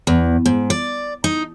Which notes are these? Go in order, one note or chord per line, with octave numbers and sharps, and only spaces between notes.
E2
G#2
D5
D#4